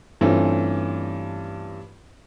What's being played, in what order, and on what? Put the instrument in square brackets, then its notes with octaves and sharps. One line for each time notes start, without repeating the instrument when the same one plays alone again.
[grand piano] G2 E3 A3 C4 C#4 F4